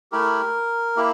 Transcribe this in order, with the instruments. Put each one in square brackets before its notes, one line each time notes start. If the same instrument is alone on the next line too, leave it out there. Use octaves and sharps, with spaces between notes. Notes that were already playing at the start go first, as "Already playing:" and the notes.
[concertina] A3 E4 G4 A#4
A#3 E4 G4